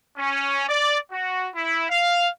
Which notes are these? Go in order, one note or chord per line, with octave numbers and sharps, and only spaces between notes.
C#4
D5
F#4
E4
F5